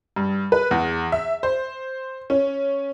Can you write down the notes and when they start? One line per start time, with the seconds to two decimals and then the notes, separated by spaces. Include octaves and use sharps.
0.16 G2
0.52 B4
0.71 E2
1.12 E5
1.43 C5
2.30 C#4